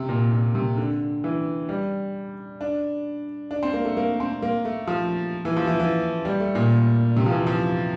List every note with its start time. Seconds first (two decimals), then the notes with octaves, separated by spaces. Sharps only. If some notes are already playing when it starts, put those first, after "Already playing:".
Already playing: C3
0.09 A#2
0.32 A#2
0.55 C3
0.77 D3
1.24 E3
1.69 G3
2.61 D4
3.51 D4
3.63 C4
3.73 A#3
3.85 A3
3.97 A#3
4.20 C4
4.42 A#3
4.65 A3
4.87 F3
5.45 E3
5.56 F3
5.67 E3
5.80 E3
6.25 G3
6.40 A3
6.55 A#2
7.17 C3
7.26 F3
7.31 E3
7.47 F3